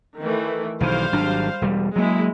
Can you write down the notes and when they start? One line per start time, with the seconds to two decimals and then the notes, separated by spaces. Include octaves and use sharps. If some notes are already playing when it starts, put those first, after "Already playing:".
0.20 D#3 E3 A3
0.80 B1 D#3 E3 G3 C5 F5
1.12 G#1 F#3 D4
1.62 E1 G3
1.96 F#3 G#3 A#3 E4